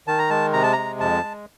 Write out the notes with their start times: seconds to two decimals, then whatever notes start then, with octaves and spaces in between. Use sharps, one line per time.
0.07 D#3 A5
0.18 A#5
0.30 G#3 A5
0.53 C3 A#5
0.63 A5
0.72 G#3 A#5
1.00 F2 A5
1.23 G#3